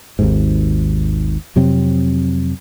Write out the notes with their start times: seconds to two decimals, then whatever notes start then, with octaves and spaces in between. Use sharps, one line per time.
0.19 G#1 D#2 G#2
1.56 F2 C3 F#3 C4